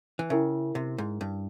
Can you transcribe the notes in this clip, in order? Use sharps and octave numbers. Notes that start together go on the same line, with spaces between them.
E3
C#3 C#4 E4 A#4 E5
C3
G#2
G2